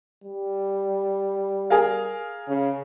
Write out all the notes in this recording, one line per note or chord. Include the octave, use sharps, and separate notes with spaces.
G3
G#4 A#4 F5
C#3